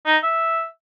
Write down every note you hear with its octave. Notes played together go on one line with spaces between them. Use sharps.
D#4
E5